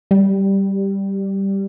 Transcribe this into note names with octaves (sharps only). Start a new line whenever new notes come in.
G3